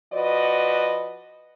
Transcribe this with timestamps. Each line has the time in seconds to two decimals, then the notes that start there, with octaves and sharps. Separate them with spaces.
0.13 F3 F#4 B4 D5 D#5